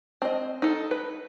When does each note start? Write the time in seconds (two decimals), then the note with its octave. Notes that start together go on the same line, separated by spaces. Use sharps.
0.22 C4 D#5
0.62 D#4 A4
0.91 B4